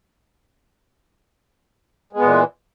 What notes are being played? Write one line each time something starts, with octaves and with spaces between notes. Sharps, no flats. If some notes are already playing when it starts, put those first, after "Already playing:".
A#2 E3 G#3 B3